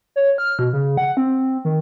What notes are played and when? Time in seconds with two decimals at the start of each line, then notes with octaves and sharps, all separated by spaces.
0.16 C#5
0.38 F6
0.59 B2
0.73 C#3
0.97 F#5
1.17 C4
1.65 D#3